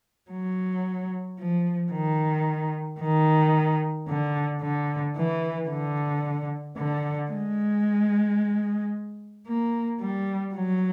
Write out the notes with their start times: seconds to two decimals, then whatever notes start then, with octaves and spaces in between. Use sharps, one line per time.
0.31 F#3
1.39 F3
1.92 D#3
3.00 D#3
4.08 D3
4.61 D3
5.16 E3
5.69 D3
6.77 D3
7.31 G#3
9.48 A#3
10.01 G3
10.55 F#3